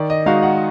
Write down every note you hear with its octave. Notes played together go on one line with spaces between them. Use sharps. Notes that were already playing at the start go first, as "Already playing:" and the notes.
Already playing: D#3 D5
D#5
G#3 D#4 F#4 F5
F#5